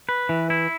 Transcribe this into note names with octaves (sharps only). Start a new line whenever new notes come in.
B4
E3
E4